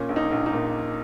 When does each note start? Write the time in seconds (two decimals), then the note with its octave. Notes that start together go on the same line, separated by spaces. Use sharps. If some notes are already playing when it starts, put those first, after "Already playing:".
Already playing: A#2 C#4
0.09 A#1
0.16 D#4
0.31 A#1
0.46 D#4
0.53 A#2